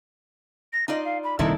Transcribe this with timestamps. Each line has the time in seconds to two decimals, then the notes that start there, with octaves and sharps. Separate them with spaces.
0.73 A#6
0.88 D#4 F4 D5 D#5
1.04 F5
1.24 B5
1.39 D#1 C2 D#3 D#4 E4 A4 D5